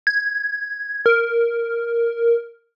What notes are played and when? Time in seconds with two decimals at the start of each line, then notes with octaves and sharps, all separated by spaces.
0.07 G#6
1.06 A#4